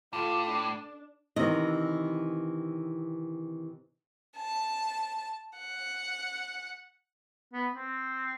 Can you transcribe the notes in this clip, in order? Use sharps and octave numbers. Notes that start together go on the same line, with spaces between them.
A2 F4 A4 D6
D4
C3 D#3 E3 D#5
A5
F#5
B3
C4